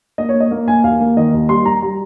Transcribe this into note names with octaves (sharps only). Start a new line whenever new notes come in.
A#3 D#5
C#5
A#3
D#5
A#3
A#3 G#5
D#2 F5
A#3
D#3 D#5
D#2
G3 C6
G3 A#5
G3 A#5